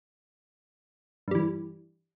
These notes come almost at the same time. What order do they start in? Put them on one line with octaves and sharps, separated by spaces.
G2 G3 E3